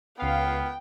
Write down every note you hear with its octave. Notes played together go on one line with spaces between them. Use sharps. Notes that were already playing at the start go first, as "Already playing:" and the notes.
C#2 B3 F5 G5